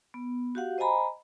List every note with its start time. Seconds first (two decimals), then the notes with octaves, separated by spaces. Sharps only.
0.14 B3
0.55 F#4 G4 F5 F#5
0.78 C5 D#5 F#5 G#5 A#5 B5